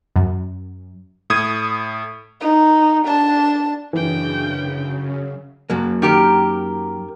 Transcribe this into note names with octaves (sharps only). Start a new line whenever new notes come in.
F#2
A2 D#6 G#6 D#7
D#4
D4 A5
F#2 C#3 E3 D4 G5
F#2 F#3 A#3
D#3 G4 A#4